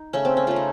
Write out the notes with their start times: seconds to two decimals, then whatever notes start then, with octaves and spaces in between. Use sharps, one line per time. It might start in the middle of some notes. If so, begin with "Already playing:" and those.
Already playing: D#4
0.13 C#3 A3 C#4
0.25 C4
0.37 C#4
0.47 C#3 A3 F4
0.56 D#4